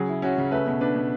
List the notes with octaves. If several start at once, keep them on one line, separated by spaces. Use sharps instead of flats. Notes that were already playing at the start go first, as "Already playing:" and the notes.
Already playing: C#3 F#3 G#4
E4
C#4 F#4
C#3
A3 B4
B2
D4 B4
B2